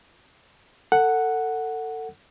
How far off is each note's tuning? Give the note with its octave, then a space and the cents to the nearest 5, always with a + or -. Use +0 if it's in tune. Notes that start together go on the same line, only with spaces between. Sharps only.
A4 +30 F#5 +0